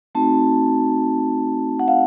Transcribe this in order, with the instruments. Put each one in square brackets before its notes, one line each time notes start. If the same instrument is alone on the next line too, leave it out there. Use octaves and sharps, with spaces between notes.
[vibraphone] A3 C4 D#4 F#4 A5
F#5
F5